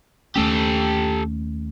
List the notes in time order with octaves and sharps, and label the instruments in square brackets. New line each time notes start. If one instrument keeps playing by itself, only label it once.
[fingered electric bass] D#2 A3 C#4 [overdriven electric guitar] G4 A4